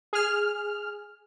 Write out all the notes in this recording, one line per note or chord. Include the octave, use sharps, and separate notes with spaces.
G#4 F6